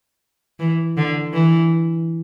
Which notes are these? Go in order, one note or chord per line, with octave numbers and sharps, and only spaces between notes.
E3
D3
E3